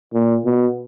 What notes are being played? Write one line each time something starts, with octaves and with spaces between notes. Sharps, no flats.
A#2
B2